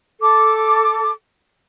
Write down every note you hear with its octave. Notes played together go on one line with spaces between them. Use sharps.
A4 D6